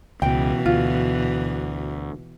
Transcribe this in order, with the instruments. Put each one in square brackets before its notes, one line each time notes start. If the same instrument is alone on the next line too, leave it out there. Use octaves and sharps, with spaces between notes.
[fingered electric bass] C#2 [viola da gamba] B2 E3 [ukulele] G5
[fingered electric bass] D2 [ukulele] F4